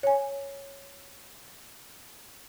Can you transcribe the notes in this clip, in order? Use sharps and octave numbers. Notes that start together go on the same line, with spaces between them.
C#5 G#5